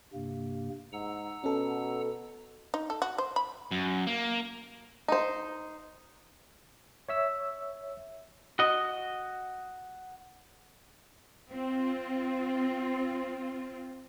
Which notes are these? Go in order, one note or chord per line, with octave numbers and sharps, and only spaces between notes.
G2 C3 A#3
G#2 F#5 A#5 E6
B2 C#4 A4
D#4
A4
F#4
C5
B5
F#2
A#3
D#4 C5
C#5 E5 E6
F#4 D#5
C4 F4